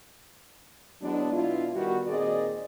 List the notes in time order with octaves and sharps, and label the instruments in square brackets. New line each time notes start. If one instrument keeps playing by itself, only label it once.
[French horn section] E3 F#3 G#3 B3 D4
B2 D4 E4 F4
D#3 G3 B3 F#4
A#2 D#3 C4 G#4 D5 D#5